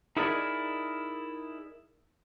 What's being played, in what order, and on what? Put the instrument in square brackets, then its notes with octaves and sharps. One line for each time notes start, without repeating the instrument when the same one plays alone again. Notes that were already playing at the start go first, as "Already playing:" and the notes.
[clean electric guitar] D#4 E4 G#4 A#4 D5